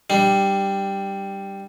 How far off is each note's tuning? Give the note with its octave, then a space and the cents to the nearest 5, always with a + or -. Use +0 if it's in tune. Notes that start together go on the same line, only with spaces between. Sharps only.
G3 +0 D4 +15